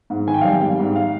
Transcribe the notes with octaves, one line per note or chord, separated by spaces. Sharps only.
G#2
D#3 G#5
G5
F5
G3 G5
G3
G#2
F5